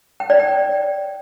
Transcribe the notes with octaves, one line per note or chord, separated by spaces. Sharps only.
G5
D5
G5